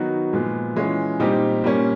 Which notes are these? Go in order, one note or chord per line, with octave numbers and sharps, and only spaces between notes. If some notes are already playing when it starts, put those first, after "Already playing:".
Already playing: D#3 F#3 B3 D#4 F#4
A#2 F3 G#3 B3
E3 G#3 C#4 F4
A#2 G3 C4 D#4 G4
A#2 G3 A#3 C#4